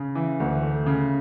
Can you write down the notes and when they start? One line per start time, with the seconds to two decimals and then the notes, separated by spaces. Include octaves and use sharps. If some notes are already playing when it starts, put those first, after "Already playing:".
Already playing: C#3
0.15 E3
0.40 D2
0.62 A3
0.86 C#3